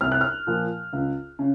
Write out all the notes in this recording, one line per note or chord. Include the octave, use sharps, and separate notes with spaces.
C2 F6
F#6
F6
A#2 F3
C#2
C#3